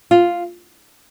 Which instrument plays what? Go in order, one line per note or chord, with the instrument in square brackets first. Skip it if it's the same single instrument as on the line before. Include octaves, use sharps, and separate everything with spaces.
[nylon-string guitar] F4